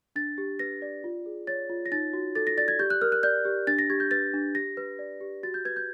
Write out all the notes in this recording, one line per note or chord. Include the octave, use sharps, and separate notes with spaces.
D4 A6
G4
B4 A#6
D5
F4
G#4
C#5 A6
F4
A#6
D#4 A6
F#4
A4 A6
A#6
D5 A6
G#6
G4 G6
F#6
A#4 F6
F#6
D5 G6
G4
D4 A6
A#6
G4 G#6
G6
B4 A6
D4
G4 A#6
B4
D5
G4
F#4 A6
G6
B4 G#6
G6